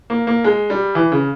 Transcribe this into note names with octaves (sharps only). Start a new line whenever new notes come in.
A#3
A#3
G#3
G3
E3
C#3